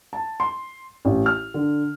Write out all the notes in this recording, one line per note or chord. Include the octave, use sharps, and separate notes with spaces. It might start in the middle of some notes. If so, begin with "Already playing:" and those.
A5
C6
A1
F6
D3